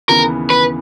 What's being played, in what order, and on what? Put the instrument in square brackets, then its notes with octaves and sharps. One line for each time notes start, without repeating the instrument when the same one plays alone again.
[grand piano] D#2 C#3 E3 B3 [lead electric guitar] A#4
[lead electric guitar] B4